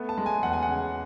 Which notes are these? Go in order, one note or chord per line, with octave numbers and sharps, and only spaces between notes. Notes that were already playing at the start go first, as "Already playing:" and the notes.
Already playing: A3 B3
A5
G#3
G#5
E2 F#5
G#5
F#5
C#3